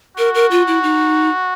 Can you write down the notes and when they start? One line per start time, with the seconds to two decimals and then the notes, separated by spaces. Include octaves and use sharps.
0.17 F#4 A#4
0.35 A#4
0.51 F4
0.67 E4
0.83 D#4